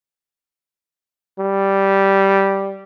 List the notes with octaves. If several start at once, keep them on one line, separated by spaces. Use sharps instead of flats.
G3